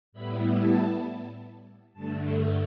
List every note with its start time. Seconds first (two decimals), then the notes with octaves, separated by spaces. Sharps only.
0.12 A2 G3 B3 E4 B5
0.58 A5
1.93 G2 D3 A3 A5